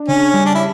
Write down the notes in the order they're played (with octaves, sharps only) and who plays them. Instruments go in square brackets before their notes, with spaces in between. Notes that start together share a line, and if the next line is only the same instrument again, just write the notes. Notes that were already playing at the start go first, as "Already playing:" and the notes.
Already playing: [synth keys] D4
[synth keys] C#3 [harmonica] C#4
[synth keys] G3
[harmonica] D4
E4